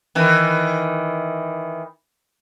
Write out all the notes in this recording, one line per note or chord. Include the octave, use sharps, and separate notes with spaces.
D#3 E3